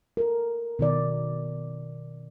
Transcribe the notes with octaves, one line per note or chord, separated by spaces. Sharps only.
A4 A#4
B2 D#3 D5